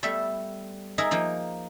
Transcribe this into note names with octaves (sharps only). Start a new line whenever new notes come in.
G3 A3 B3 E5
D#4 G#4 A#4 D#5 E5
F3 A#3 D#4